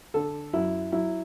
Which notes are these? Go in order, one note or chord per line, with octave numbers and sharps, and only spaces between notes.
D3 A4
F#2 E4
F#3 E4